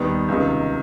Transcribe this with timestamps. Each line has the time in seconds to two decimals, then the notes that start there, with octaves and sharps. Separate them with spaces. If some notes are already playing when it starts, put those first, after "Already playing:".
Already playing: D#2 D#3 G3 B3
0.28 C#2 C3 D#3